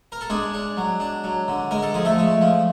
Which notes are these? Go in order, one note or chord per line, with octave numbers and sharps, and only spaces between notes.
A#4
A4
G#3 D4 G#4
D4
F#3
D4
F#3
D3
G#3 A#4
A4
F3 G#4
A3 A4
G#3
F3